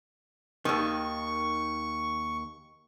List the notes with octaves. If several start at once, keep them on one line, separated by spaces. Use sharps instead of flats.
D#2 D#3 C#6